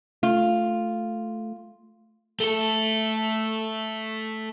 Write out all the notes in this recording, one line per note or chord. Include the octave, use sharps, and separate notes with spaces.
A3 F4
A3 A4